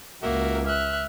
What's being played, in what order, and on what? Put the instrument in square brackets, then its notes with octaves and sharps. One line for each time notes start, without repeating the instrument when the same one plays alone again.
[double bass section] C#2 [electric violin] A#3 [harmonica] F#4 A#4 E5
[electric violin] E5 F#6 [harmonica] F6